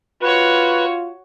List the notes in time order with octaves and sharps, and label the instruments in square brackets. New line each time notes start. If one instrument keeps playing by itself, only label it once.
[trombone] F4 [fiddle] F#4 C#5 [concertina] B4